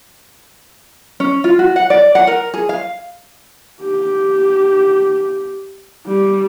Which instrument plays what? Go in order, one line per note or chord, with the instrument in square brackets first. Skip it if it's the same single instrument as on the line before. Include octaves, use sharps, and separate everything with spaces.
[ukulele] C#4
F4
F#4
F#5
D5
F#5
A#4
G#4
F5
[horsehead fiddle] G4
G3